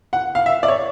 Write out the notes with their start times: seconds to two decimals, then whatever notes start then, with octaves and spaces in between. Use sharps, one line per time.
0.13 F#5
0.35 F5
0.46 E5
0.63 D5
0.68 C#5